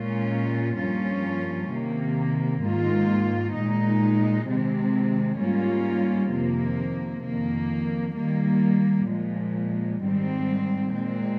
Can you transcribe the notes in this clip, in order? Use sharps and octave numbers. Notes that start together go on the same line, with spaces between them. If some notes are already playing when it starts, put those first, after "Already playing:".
Already playing: A#2 G#3 C#4 F4
G2 F3 A#3 C#4 F4
C3 D#3 A#3
G#2 D#3 A#3 F4
A#2 G#3 D#4
C3 D#3 G#3 C4
G#2 G3 A#3 C#4 F4
F2 C3 D#3 A#3
F2 D#3 A#3
D#3 G3 A#3
A#2 F3 G#3
G#2 D#3 G3 C4
A#2 G#3 C4